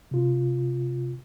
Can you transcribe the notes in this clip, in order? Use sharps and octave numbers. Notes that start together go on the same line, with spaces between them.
C3 F4